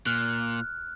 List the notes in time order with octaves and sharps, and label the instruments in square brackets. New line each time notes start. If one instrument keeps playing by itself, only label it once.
[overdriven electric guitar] A#2 [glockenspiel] F6 F#6